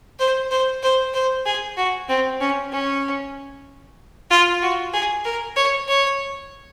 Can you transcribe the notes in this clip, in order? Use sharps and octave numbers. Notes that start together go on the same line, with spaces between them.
C5
C5
C5
C5
G#4
F#4
C4
C#4
C#4
F4
F#4
G#4
A#4
C#5
C#5